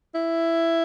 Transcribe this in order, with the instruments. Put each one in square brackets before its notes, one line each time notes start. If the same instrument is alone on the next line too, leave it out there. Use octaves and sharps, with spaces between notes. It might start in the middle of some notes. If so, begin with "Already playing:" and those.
[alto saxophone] E4